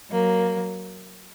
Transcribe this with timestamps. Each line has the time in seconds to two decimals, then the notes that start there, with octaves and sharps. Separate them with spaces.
0.11 F#3 A#3